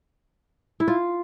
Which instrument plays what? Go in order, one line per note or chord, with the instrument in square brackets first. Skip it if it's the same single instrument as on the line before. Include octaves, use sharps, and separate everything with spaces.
[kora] E4
F4